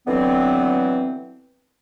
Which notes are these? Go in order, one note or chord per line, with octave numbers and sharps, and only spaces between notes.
B2 D3 E3 F#3 B3 C4